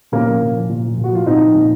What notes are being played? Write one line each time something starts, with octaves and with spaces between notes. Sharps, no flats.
A#2 A#3 C#4
F3
A#2
F3
A#2
F3
A#2
F#4
F3 F4
A#2 C4 D#4
F3
A#2